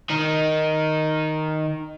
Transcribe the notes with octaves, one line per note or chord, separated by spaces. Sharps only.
D#3 D#4